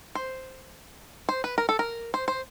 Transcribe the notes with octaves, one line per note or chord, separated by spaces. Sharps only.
C5
C5
B4
A#4
A4
A#4
C5
C5